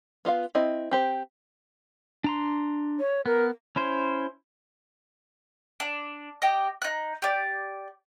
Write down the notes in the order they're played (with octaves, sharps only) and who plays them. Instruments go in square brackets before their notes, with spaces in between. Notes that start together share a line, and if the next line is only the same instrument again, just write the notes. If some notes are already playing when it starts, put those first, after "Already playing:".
[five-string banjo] B3 F4 D#5 F5
C4 E4 D#5
C4 G4 C5
[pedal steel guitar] D4 A#5 C6
[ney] C#5
[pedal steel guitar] B3 [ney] A#4
[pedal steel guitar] C#4 E4 C5
[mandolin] D4
G4 D#5
D#4 F#6
G4 D5